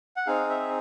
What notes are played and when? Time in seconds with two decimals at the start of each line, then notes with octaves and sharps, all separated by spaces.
0.16 F#5
0.27 C4 D#4 G#4 F5
0.50 E5